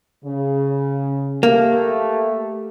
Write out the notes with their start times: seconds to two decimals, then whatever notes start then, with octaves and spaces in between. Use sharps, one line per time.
0.24 C#3
1.43 A3 A#3 G4